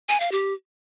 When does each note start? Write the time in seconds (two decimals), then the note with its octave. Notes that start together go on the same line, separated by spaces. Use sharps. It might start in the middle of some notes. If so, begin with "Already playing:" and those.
0.09 G#5
0.20 F5
0.32 G4